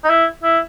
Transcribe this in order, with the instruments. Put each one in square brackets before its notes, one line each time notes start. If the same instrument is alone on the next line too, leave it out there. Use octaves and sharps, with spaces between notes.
[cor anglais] D#4
E4
E4